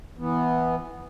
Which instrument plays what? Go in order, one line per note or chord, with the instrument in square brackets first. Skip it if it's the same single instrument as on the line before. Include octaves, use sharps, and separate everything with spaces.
[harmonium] E3 B3